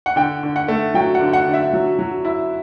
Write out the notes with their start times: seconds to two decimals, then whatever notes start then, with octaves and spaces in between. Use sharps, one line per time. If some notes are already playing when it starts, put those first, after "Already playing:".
0.06 F#5
0.16 D3 G5
0.43 D3
0.56 F#5
0.68 A3
0.94 F#3 G5
1.15 F#5
1.21 D3
1.33 F#5
1.47 D3
1.54 E5
1.73 F#3
1.99 F#3
2.25 E4